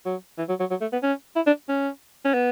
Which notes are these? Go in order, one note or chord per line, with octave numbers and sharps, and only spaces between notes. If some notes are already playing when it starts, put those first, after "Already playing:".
F#3
E3
F#3
F#3
F#3
A3
B3
C#4
E4
D4
C#4
C#4
B3